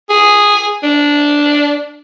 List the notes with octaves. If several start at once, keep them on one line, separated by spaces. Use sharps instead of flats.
G#4
D4